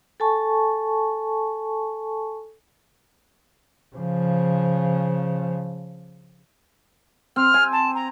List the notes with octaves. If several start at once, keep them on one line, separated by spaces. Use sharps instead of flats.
A4 G#5 A5 C#6
C#3 F3
C4 F6
G#5
A5
A#5